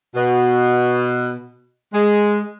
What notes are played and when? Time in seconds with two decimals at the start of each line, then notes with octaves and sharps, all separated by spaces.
0.15 B2
1.94 G#3